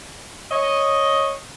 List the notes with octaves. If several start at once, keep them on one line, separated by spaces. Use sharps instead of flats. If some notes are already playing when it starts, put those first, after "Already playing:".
C#5 D#5